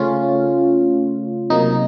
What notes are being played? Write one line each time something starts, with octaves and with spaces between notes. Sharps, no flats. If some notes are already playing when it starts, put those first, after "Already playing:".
Already playing: C#3 A3 C#4 F4
C3 F#3 A#3 D#4